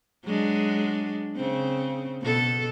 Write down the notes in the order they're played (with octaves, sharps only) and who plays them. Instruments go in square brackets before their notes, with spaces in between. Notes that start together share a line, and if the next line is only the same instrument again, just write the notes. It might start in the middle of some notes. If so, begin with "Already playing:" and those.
[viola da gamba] F#3 G#3 D4
C#3 C4
B2 A4